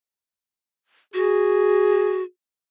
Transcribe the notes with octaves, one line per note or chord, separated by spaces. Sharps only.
F#4 G#4